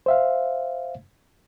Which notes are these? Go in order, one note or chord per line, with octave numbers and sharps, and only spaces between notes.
C5 E5 F5